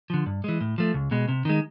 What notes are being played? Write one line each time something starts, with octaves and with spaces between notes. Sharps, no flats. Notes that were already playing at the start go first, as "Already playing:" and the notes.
D3 F3
G2
E3 G#3
A2
F3 A3
C#2
B2 G#3
C3
D#3 G#3